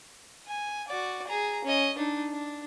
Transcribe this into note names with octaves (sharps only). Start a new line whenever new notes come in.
G#5
F#4 D5
G#4 A#5
C#4 D#5
D4 D#4
D4